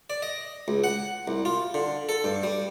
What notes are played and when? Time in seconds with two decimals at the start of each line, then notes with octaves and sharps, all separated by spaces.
0.10 D5
0.22 D#5
0.68 C#2
0.84 F#5
1.28 C2
1.45 F4
1.74 D3
2.09 A4
2.24 G2
2.43 G3